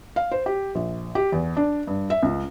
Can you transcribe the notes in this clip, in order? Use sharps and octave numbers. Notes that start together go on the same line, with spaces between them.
F5
C5
G4
A#1
G4
E2
D4
G2
E5
C#2